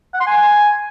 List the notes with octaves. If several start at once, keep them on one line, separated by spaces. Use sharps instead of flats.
F#5
C6
G#5